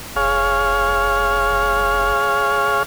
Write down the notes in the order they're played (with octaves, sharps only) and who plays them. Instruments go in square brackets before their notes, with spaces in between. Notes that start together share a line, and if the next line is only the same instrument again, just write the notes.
[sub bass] F1 [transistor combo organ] G#4 C#5 F5